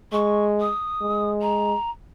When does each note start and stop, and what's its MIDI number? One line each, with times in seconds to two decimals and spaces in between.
0.13 0.69 56
0.13 0.44 85
0.61 1.30 87
1.02 1.74 56
1.42 1.90 82